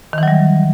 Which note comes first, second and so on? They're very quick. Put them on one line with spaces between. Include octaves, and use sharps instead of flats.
D#3 E3 F#3 G3